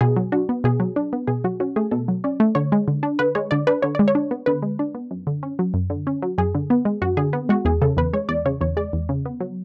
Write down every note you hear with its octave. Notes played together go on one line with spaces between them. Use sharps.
B2 G#4
F#3
D4 F#4
B3
B2 G#4
F#3
D4
B3
B2 G#4
F#3 F#4
C#4 F#4
A3 G#4
B2 A4
F#3
C#4 D5
A3
D3 C#5
G#3
D3
D4
D3 B4
G#3 C#5
D3 D5
D4 B4
D3 C#5
G#3 D5
C#5
D4
B3
D3 B4
G#3
D4
B3
F#2
D3
C#4
F#3
F#2
D3
C#4
F#3
F#2 G#4
D3
B3
G#3
F#2 F#4
D3 G#4
B3
G#3 F#4
E2 G#4
C#3 A4
E2 B4
G#3 C#5
E2 D5
C#3 C#5
E2 C#5
G#3 D5
E2
C#3
B3
F#3